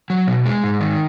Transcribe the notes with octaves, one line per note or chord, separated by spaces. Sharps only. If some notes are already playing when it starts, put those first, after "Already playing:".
F#3
B2
G#3
G#2
D#3